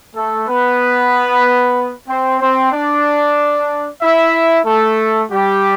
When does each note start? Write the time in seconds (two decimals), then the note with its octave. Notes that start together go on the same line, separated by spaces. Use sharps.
0.15 A3 A4
0.48 B3 B4
2.08 C4 C5
2.40 C4 C5
2.72 D4 D5
4.01 E4 E5
4.65 A3 A4
5.30 G3 G4